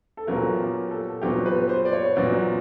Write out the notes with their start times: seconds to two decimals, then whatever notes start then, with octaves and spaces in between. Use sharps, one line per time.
0.17 A4
0.27 A#2 F#3 B3 A#4
0.59 G4
0.91 A4
1.21 A#2 F#3 B3 G4
1.46 B4
1.69 C5
1.85 D5
1.93 C#5
2.16 A#2 F#3 B3 D5